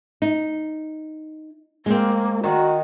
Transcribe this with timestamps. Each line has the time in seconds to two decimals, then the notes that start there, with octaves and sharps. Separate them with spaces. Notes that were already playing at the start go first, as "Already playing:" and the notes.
0.22 D#4
1.86 G#3 A#3 C4
2.44 D#3 F#4